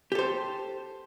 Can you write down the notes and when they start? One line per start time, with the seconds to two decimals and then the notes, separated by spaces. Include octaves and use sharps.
0.12 G4
0.15 A4
0.19 C5